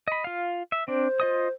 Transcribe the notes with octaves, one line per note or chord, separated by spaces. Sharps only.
D#5 B5
F4 F5
E5
C4 D4 C5
F4 D#5 D#6